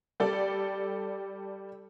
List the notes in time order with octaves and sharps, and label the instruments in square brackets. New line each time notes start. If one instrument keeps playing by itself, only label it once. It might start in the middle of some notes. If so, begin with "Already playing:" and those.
[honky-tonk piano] G3 A4 D5